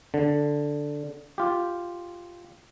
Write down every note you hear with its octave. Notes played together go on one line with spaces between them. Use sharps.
D3
F4 G4